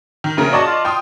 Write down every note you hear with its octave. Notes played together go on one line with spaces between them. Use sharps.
D#3
A#1 C#3 A#4
F#4 D5 D#5 A5
F4
G5 C6 D#6